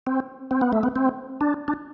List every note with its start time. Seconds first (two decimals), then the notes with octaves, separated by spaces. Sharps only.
0.07 C4
0.51 C4
0.61 B3
0.73 A3
0.83 B3
0.96 C4
1.41 D4
1.68 D4